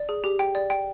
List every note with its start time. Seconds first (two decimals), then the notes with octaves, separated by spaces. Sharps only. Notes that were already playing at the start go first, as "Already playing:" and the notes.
Already playing: D5
0.09 G#4
0.24 G4
0.39 G5
0.55 D5
0.70 G5